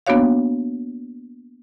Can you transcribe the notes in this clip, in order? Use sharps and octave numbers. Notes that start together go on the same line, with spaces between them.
A#3 B3 D4 F#4 C#5 F5